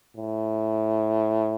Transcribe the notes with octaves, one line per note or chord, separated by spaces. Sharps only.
A2